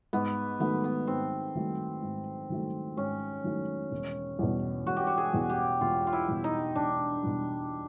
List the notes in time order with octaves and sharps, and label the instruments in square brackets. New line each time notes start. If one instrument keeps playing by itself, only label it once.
[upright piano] G#2 [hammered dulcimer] B3
[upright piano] D#3 F#3 A3 [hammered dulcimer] B3
[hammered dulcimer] B3
[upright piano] G#2 [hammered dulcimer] C4
[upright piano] D#3 F#3 A3
G#2
D#3 F#3 A3
[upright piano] G#2 [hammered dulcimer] C#4
[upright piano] D#3 F#3 A3
E1
E2 B2
[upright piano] E1 [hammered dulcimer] F#4
[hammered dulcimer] G4
F#4
G#4
[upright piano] E2 B2
[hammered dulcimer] G4
[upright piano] E1 [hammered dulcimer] F4
[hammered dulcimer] F4
E4
[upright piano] E2 B2
[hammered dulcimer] D#4
[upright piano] E1 [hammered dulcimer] D4
[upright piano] E2 B2